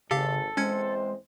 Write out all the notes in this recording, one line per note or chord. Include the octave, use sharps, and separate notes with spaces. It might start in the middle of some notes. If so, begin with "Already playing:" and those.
G#1 C#3 G4 A4 F5
E2 G#3 C4 C#4 C5 G#6 C#7